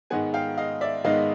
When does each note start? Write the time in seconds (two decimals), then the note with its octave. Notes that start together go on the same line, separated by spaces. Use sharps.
0.10 G#2 D#3 G#3 B3 F#5 G#5
0.34 F5 G5
0.58 D#5 F5
0.81 D5 E5
1.04 G#2 D#3 G#3 B3 D#5 F5